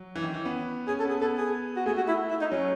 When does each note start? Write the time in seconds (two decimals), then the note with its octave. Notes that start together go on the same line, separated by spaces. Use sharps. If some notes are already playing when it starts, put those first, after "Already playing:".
Already playing: F#3
0.16 E3
0.23 D#3
0.34 E3
0.41 C#4
0.45 B3
0.88 C#4 G#4
0.99 A4
1.05 B3
1.10 G#4
1.21 B3 A4
1.38 G#4
1.77 F#4
1.86 A3 G#4
1.97 F#4
2.08 E4
2.30 E4
2.41 D#4
2.52 F#3 C#4